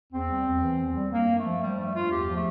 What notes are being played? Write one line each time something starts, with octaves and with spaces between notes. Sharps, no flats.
E2 C4
G3
E2
E3
E2
G3
G2 A#3
G2
A3
F3
F3 G3
G2 A3
G2 F4
E2 G4
F3
A3